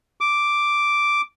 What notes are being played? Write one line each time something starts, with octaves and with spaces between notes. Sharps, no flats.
D6